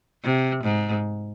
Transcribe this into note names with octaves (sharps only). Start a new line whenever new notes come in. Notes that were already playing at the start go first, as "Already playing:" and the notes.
C3
G#2